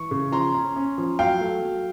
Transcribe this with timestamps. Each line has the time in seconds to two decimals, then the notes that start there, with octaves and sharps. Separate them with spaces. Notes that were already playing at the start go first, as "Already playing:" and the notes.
Already playing: E3 C#6
0.11 C#3
0.32 F3 A#5 C6
0.55 C#4
0.76 C#4
0.98 F3
1.19 F#3 F5 G5
1.41 A3
1.62 F#3